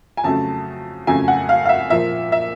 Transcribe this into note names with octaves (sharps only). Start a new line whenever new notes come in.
G#5
F2 C#3 F#3 A3 A5
F2 C#3 F#3 A3 G#5
F#5
F5
F5
E5
A#2 F3 A#3 E5
E5